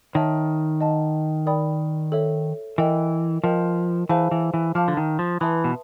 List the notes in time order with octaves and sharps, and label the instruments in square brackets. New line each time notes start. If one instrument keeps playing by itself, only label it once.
[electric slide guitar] D#3 [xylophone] C#5 E5 A5
[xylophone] D#5 F#5 A5
A#4 D5 G5 B5 D#6
A4 C#5 E5
[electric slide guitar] E3 [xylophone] A#4 D#5 G5
[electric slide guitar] F3 [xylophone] A#4 D#5 G5
[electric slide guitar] E3 [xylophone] G#4 C5 F5 A5
[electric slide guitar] E3
E3
[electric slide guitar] F3 [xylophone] F5 A5 D6 F6
[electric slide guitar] D3
D#3
F3
[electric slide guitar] E3 [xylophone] B4 E5 A5 C6 D#6
[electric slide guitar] B2